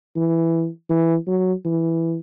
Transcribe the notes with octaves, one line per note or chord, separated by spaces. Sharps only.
E3
E3
F#3
E3